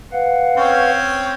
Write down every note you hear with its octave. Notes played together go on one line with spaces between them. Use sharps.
B4 F5 F#5
C4 C#4